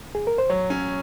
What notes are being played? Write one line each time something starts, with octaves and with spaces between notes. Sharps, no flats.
G#4
A#4
C5
F#3 C#5
C#4